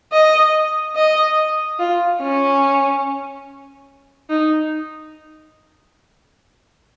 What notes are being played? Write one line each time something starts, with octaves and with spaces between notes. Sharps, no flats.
D#5
D#5
F4
C#4
D#4